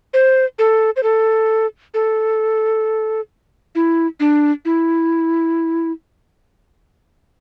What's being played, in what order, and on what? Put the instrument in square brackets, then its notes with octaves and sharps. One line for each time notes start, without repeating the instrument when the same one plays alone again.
[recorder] C5
A4
C5
A4
A4
E4
D4
E4